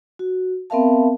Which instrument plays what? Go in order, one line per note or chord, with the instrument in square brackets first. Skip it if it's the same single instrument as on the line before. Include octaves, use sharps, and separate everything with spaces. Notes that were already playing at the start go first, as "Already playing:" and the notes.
[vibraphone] F#4
B3 C4 A#4 E5 F5 A5